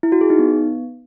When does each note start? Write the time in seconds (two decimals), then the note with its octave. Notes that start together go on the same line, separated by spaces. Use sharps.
0.03 E4
0.12 F#4
0.21 G#4
0.30 D#4
0.39 B3